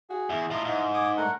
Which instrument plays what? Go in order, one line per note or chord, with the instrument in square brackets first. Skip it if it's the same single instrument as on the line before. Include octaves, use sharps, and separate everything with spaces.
[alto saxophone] F#4 [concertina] G#4
[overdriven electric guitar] E2 [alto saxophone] E4
[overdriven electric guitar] A2 F4 [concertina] D#5 A#5
[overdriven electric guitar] G#2
[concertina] G#5 D6 D#6
[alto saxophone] D3 [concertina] A3 A#4 F#5